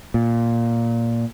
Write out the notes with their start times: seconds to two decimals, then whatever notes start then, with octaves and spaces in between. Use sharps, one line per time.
0.14 A#2